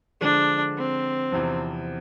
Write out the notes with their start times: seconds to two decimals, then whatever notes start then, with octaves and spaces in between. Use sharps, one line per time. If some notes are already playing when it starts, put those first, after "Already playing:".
0.20 D3 F3 G#3 D4
0.77 C4
1.32 E2 C3 F3